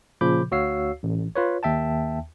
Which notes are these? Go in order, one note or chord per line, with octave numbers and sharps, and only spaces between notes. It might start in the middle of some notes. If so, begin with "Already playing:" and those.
A#2 C#3 F3 B5 D6 G6
D2 F#4 C#5 F5 E6 C7
A1
F4 B4 C#5
D#2 E5 G5 A5